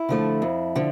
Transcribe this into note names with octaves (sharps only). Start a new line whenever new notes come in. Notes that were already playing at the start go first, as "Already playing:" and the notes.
Already playing: E4
D3 F3 A3
F2
D3 F3